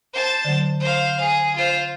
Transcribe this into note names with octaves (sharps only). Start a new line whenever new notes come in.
C5 A5
D3 F#3
C5 F5
G#4
F4 C5